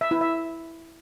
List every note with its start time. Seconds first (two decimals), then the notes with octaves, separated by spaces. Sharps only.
0.01 E5
0.11 E4
0.21 E5